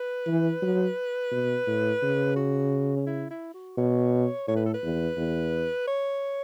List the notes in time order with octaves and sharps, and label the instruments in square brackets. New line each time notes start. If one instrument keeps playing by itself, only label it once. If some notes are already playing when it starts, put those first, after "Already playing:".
Already playing: [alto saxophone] B4
[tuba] E3
F#3
B2
A2
C#3
[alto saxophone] F#4
C#4
E4
E4
F#4
[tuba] B2 [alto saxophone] C#5
[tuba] A2 [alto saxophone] C#5
[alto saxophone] B4
A4
B4
[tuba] E2
E2
[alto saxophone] C#5